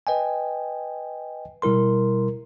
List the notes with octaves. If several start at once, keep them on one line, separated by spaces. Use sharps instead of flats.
B4 D#5 G5 G#5
B2 G3 E4 A#4 C6